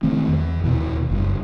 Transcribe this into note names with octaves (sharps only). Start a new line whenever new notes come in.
D#3 A3 C4
E2
D#2 B2
F#1 G2